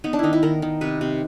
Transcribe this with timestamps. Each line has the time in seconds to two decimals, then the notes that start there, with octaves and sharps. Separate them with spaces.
0.04 B3 D#4
0.13 D4
0.19 D#3 D#4 E4
0.33 E4
0.43 D#3 A#4
0.62 D#3
0.81 C3 B4
1.01 C3